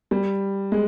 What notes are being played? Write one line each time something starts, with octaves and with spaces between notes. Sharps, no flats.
G3
G#3